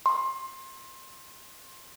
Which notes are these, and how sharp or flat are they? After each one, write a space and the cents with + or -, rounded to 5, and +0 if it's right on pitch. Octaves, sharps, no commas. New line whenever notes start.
C6 +25